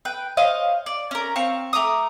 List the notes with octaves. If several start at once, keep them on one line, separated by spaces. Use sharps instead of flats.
B4 G5
C5 C#5 D#5 F5
D5
C#4 A#4
C4 F5 C#6
A3 A#5 D6 D#6